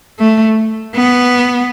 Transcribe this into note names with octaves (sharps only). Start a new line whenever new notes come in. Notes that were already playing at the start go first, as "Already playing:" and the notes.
A3
B3